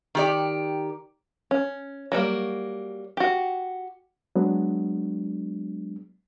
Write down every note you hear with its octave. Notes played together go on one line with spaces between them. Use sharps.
D#3 G4 D5
C#4
F#3 G3 A3 A#3
F#4 G4
F#3 G#3 B3 D4